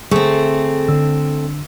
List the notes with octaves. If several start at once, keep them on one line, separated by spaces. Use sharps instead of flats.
D3 A3 C4 G#4 C#6
D3 D4 E6